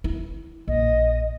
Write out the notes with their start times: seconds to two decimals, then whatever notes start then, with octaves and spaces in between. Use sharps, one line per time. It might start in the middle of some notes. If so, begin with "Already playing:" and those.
0.04 E4
0.68 A#1 D#5